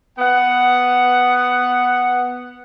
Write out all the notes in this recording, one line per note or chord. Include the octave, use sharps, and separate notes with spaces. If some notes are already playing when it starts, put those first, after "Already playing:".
B3 F#5